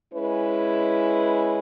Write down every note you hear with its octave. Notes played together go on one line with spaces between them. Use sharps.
G#3 C#4 E4 B4